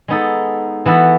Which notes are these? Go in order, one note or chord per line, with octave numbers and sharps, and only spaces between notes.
G#3 B3 D#4 A4
E3 B3 F#4 A4